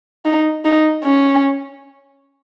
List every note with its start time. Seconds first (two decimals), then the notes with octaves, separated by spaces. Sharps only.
0.25 D#4
0.65 D#4
1.04 C#4